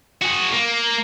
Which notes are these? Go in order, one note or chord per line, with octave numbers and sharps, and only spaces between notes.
F#4 G#4
A#3